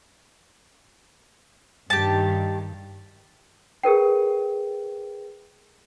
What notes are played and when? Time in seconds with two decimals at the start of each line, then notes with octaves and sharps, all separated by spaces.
1.90 G2 D#3 G4 A5
3.83 G#4 A#4 B4 G5